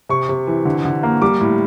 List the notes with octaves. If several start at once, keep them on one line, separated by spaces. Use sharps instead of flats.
C3 C#6
C3
E3
D3
D3
A#3
G3 D6
A2